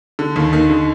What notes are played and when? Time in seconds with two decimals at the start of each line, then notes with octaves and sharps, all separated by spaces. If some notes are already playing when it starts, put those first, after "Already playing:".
0.19 D3
0.36 D#2 D#3
0.53 D#2 D#3
0.70 D3